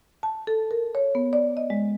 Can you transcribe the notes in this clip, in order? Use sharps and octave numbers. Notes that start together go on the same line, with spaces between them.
A5
A4
A#4
C#5
B3
D5
D#5
G#3